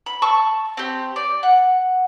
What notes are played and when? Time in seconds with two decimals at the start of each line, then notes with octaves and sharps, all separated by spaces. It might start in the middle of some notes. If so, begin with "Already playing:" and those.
0.06 B5
0.22 A5 C#6 E6
0.77 C4 G4
1.16 D5
1.43 F#5